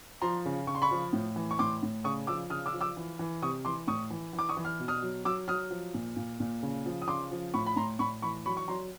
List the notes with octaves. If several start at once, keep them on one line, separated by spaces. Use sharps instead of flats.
F3 A#5 C6
C#3
C#3 C#6
C6
B5 C#6
F3
A2
E3
C#6
A2 C6 D6
A2
C#3 C#6 D#6
F3 D6 E6
C#3 D#6 F6
D6 E6
F3
D6 E6
E3
E3
C3 C#6 D#6
E3 C6 D6
A2 C#6 D#6
E3
E3
D6
C#6 D#6
E3
F6
B2
D#6 F6
F#3
F#3 D6 E6
F#3 D#6 F6
F3
A#2
A#2
A#2
C#3
F3
D#6
C#3 C6 D6
F3
A2 B5 C#6
B5
A2 A#5 C6
A2 B5 C#6
E3 B5 C#6
F#3 B5 C#6
C#6
F#3 A#5 C6